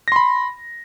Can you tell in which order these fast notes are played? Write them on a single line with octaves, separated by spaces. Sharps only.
A#6 C6 B5